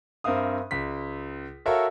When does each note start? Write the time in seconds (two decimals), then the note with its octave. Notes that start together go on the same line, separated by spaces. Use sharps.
0.24 G2 C4 A#4 E5 F5 D#6
0.71 C#2 B6
1.66 F#4 A4 A#4 C#5 E5 F5